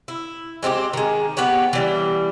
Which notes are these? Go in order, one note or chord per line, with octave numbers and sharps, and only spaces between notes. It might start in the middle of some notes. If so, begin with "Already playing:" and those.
E4
G#3 C4 F4 G4
D#3 G#3
B3 G4 B4 C#5
E3 G3